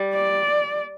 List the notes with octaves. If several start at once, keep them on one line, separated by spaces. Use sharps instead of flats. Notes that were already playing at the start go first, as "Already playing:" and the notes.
Already playing: G3
D5